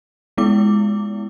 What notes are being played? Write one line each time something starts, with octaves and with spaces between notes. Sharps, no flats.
G#3 B3 E4 D6